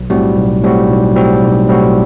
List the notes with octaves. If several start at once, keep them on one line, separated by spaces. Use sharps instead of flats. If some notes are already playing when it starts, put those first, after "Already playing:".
Already playing: B1
A2 G3 C4 F#4
B1
A2 G3 C4 F#4
B1
A2 G3 C4 F#4
B1
A2 G3 C4 F#4